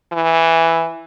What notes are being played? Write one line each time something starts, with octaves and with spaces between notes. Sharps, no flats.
E3